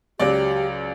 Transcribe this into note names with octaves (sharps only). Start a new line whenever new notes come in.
C#2 F#3 G4 D5